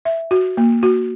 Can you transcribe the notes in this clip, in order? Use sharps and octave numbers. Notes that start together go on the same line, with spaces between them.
E5
F#4
A#3
F#4